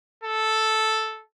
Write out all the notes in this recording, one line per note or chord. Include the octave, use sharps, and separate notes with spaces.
A4